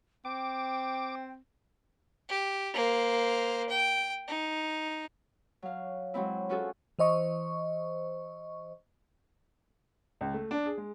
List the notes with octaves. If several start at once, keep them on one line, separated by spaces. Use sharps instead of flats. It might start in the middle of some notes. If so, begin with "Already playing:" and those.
C4 G5 D6
G4
A#3 C5
G5
D#4
F#3 F5
F#3 G#3 C4 E4
C#4 F4 F#4 G#4 A4
E3 C5 D#5 C#6
C#2
A3
D4
G#4
G#3